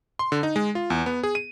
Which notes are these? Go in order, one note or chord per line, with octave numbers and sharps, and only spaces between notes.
C6
D3
D#4
G#3
F4
E2
B3
G#4
D#7